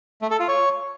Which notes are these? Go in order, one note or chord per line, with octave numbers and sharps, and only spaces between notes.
A3
A4
F4
C#5